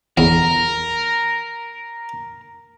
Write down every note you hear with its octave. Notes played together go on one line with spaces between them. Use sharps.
E2 A#4